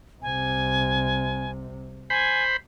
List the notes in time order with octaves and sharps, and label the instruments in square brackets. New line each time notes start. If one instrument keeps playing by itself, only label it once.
[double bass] C2 C3 [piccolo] G#5
[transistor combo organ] C5 B5 [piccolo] G#5